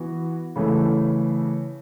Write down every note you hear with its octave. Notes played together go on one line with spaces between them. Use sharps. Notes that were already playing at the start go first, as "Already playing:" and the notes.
Already playing: E3 B3 F#4
C#3 E3 A3